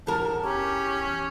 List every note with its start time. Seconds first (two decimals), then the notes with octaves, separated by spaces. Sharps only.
0.07 E2 A#4 A5
0.42 C#4 G4